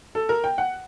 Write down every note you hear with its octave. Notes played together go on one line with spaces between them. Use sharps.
A4
A#4
G5
F#5